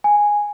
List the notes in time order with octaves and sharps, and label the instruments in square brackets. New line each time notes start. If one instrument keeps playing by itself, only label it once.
[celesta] G#5